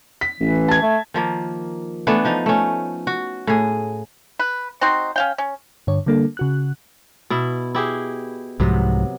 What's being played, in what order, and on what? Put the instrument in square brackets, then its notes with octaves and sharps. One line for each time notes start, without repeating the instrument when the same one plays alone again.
[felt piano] B6
[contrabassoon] A1 [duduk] E3
[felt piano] A5 G#6
[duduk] A3
[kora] D#3 F3 A#3
E3 A3 B3 D4
F3 D#4
A3 C#4
F#4
A2 G#4
[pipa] B4
C4 D#4 F#4 C5
C#4 F5 G5
C#4
[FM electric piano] G2 D3 C#5
D3 G3 A#3 D4 A4
C#3 F#4 F#6
[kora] B2 E4
E4 G4 G#4
[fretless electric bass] C2 G#2 F3 [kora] C3 F#3 B3